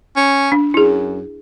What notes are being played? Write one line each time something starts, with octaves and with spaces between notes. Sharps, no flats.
C#4
D4
F#2 E4 G#4